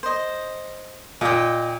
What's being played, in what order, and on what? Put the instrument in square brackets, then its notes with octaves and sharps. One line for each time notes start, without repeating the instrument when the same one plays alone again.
[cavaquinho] C5 D#5
[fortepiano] A#2 [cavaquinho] D#5 G5